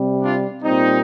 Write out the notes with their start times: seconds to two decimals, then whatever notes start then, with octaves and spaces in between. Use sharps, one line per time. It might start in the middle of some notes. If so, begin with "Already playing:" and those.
Already playing: C3 G3
0.22 D4 F4
0.63 A#2 G3 C4 D#4